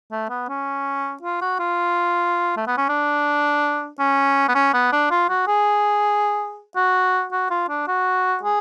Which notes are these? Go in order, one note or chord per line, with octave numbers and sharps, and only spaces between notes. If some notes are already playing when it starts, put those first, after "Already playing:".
A3
B3
C#4
F4
F#4
F4
A3
B3
C#4
D4
C#4
B3
C#4
B3
D4
F4
F#4
G#4
F#4
F#4
F4
D4
F#4
G#4